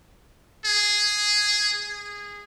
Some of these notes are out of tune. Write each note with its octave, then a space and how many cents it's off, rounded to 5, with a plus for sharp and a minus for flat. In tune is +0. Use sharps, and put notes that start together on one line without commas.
G#4 +0
G#4 -20